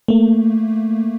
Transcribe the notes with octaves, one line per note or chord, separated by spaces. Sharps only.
A3 A#3